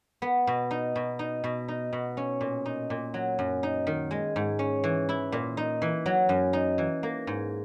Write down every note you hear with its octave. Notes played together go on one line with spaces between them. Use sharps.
B3
B2
D#4
B2
D#4
B2
D#4
B2
C#4
A#2
D#4
A#2
F#3
F#2
D#4
D#3
G#3
G#2
C#4
E3
E4
A#2
D#4
E3
F#3
F#2
D#4
E3
A#3
G#2